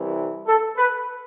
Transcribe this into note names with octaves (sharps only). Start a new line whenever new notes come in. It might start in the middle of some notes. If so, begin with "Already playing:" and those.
Already playing: C2 C3 E3
A4
B4